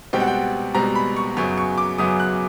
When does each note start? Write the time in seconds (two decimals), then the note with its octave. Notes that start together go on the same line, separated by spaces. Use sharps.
0.13 C#2 B2 G3 C4 G5
0.20 F#5
0.27 G5
0.75 C#2 B2 G3 C4 A#5
0.95 B5
1.16 C#6
1.36 F#2 C#3 F#3 B3 C#6
1.58 C#6
1.78 D6
1.98 F#2 C#3 F#3 B3 D#6
2.20 F#6